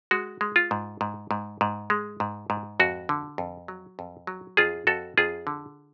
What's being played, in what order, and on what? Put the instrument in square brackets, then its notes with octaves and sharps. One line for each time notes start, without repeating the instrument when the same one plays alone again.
[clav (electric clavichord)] G#3 F#4
G#3
F4
G#2
G#2
G#2
G#2
G#3
G#2
G#2
F2 F#4
D3
F2
F#3
F2
F#3
F2 F4 G#4
F2 F#4 A4
F2 F4 G#4
D3